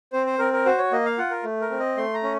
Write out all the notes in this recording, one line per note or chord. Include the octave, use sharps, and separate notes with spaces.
C4 C5
C5
C4 A#4
A#4
F#4 C5
C#5
A#3 D#5
F5
F4 F#5
A#4
A3
A#4
C4
D#5
A3 C6
A#5
C#4